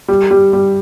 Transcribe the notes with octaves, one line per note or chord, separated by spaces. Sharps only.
G3
G3
G3